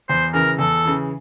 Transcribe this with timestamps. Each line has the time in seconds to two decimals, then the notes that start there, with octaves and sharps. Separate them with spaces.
0.09 E2 C5
0.34 C#3 E3 A#4
0.59 E2 A4
0.85 C#3 E3